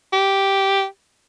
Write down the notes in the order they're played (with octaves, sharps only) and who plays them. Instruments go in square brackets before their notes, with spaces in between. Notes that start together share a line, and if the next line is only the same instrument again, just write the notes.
[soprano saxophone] G4